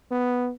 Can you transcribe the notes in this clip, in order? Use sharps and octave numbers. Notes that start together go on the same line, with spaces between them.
B3